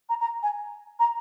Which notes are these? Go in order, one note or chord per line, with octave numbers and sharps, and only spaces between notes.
A#5
A#5
G#5
A#5